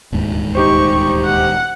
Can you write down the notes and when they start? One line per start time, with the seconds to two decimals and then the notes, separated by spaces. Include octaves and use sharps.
0.12 D#1 D2 G#2
0.55 D#4 G4 C5 C#6
1.25 F#5